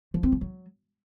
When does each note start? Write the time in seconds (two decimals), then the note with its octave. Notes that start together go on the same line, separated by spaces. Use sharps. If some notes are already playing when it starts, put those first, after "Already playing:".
0.14 F3
0.23 C4
0.32 F3
0.41 F#3